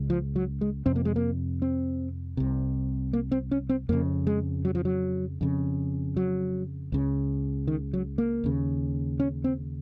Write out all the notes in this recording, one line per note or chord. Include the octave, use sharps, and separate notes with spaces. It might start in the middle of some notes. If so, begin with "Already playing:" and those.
Already playing: C#2 C#3
F3
F#3
G#3
F2 C3 C4
A#3
G#3
A#3
C4
C2 C3
A#3
C4
C#4
C4
F2 C#3 A#3
G#3
F#3
F3
F#3
F2 C#3
F#3
C#2 C#3
D#3
F#3
A#3
D#2 C#3
C#4
C4